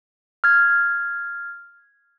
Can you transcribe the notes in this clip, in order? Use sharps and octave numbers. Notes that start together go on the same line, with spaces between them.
F6 G#6